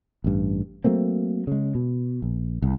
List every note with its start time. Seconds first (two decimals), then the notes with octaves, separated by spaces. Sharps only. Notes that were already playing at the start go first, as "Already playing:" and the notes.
0.24 A1 G2
0.84 F#3 A3 A#3 C4
1.47 C#3 G#3
1.75 B2
2.22 A#1
2.62 C2